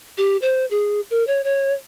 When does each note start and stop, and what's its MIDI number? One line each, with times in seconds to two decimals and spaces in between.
0.18 0.37 67
0.42 0.66 72
0.71 1.01 68
1.10 1.25 70
1.27 1.41 73
1.44 1.73 73